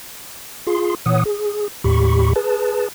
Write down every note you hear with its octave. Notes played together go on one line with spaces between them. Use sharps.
F4 G#4 C6
A#2 E3 C#5 F#5 D#6
G#4
D#2 A2 G4 B5 C#6
G#4 B4 A5